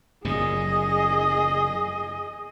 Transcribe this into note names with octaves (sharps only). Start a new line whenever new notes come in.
F#1 F#2 A#2 G#4 D#5